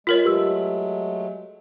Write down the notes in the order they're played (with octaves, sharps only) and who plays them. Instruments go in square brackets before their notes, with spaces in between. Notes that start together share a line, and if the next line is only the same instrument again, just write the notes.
[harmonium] G#3 [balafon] F4 A#4 C#5 [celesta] B6
[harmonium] F#3 G#3 A3 [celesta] G4 B4 E6